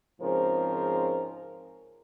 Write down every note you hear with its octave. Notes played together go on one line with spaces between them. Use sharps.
G#2 C#3 F3 C4 A#4 C5